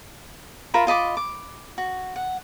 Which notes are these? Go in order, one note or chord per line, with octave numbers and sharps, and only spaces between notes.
F4 A#4 E5 B5
F4 D#5 B5 D6
D6
F#4
F#5